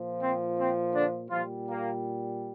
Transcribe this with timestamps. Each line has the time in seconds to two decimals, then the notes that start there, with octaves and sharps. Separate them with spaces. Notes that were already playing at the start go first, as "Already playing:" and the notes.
Already playing: A#2 F3
0.21 C4
0.58 C4
0.94 D3 D4
1.30 A#2 F3 G3 F4
1.67 A#3